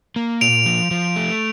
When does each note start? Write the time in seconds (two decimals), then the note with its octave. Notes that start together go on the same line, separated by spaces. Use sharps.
0.16 A#3
0.41 A#2 D7 F7
0.66 F3
0.91 F3
1.16 A3